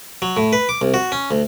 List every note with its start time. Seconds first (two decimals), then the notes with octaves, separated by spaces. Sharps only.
0.22 F#3
0.37 A2
0.53 B4
0.69 D6
0.81 C2
0.94 F#4
1.12 C#4
1.31 D2